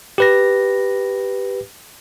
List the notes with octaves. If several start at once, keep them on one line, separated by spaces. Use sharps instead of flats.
G4 B4 A#6